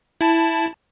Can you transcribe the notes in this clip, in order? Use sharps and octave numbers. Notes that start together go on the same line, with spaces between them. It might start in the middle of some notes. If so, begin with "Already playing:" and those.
E4 A5